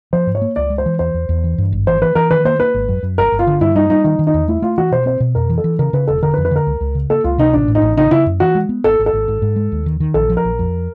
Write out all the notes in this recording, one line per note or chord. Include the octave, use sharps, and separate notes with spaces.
F3 C5
G#2
C#5
A#3
C#2 D5
G#3
C5
E3
E2 C5
E2
E2
E3
G2
G#1
E3 C5
E3 B4
E3 A#4
D#3 B4
A#3 C5
A#3 B4
G#1
F#2
F#2
G1 A#4
G1
F4
D3
G2 E4
G3 D#4
G3 D#4
D#3 D#4
D#3
D#4
E2
A3 E4
A3 F4
E3 F#4
B2 C5
C4 C5
B2
F2 A#4
E3
A4
E3
C#3 A#4
C#3 B4
E1 A4
D3 A#4
B4
F2
B4
D3 A#4
C#2
C#2
C#3
A#3 A4
C#2 F4
C3 D#4
A1 D4
A2
D#4
A1
C#3 D#4
C#3 E4
F#2
E3 F#4
G#3
B3
G#1 A4
G#1
A4
G#1
G#2
G#2
G#3
D#2
D#3
D#3
A#1 A4
F3
A#4
A#1
F2